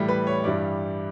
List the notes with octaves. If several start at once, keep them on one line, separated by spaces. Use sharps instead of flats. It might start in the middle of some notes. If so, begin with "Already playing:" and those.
Already playing: A2 E3 G3
B4
C#5
G2 E3 G3 D5